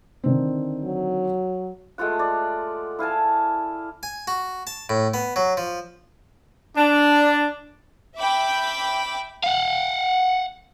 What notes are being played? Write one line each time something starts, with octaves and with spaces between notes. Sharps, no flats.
D3 D#3 C4
F#3
G#3 A3 F4 F#5
D5
E4 F5 G#5 A5
G#5
F#4
A5
A2
B3
F#3
F3
D4
E5 G5 B5 D6
F5 F#5